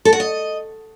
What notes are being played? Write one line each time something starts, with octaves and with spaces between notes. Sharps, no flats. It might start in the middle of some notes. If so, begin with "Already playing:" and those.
A4
F#4
D#5